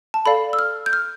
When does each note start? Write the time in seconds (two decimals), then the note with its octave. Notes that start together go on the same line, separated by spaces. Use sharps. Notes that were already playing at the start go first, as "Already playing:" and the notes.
0.14 A5
0.26 A4 D5 F5 B5
0.53 E6
0.59 F6
0.86 G6
0.93 F6